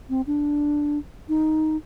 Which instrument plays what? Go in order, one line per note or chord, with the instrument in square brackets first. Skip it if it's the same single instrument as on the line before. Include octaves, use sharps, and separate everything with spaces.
[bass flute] C4
D4
D#4